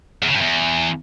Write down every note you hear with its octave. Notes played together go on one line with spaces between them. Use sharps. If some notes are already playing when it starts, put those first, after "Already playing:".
E2
C#3
G2
E2